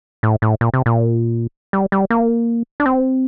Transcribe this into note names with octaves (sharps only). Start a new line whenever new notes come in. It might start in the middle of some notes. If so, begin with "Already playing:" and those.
A2
A2
A#2
C3
A#2
G3
G3
A#3
D4
C4